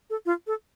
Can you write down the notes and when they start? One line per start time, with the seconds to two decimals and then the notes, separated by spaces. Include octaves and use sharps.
0.10 A4
0.26 F4
0.47 A4